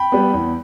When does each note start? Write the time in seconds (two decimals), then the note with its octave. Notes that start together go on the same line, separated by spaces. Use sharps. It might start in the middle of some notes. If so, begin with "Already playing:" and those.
Already playing: G5 B5
0.12 G3 B3
0.34 E2